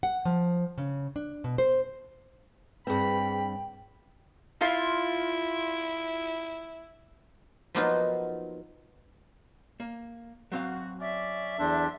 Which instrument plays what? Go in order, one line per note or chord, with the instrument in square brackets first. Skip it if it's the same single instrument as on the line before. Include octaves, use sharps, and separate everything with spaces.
[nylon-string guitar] F#5
F3
C#3
D4
B2
C5
[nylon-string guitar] G2 C4 [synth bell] G#4 B4 [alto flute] G5 [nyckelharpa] B5
[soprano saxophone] E4 [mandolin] F4 C6
[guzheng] F3 F#3 A#3 B3 D#4 F4
[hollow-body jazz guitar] A#3
[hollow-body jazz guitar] F#3 C4 F5 [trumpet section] F#4
[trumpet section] C#4 D5 [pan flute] E5
[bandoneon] E2 D4 [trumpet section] A4 C5